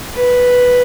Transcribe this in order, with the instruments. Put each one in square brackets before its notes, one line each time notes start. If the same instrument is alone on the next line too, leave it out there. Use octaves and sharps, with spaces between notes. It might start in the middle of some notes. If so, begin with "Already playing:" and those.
[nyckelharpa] B4